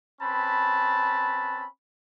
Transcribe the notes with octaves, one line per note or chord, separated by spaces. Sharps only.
C4 C#4 B4 A5 B5